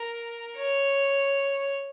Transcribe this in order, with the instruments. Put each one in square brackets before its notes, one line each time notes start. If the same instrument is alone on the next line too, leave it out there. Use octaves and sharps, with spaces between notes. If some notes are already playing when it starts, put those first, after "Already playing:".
Already playing: [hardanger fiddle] A#4
C#5